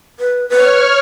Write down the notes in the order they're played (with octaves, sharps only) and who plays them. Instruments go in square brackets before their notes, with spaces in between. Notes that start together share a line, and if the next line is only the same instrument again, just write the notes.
[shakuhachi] B4
[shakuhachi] B4 [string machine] C#5 F6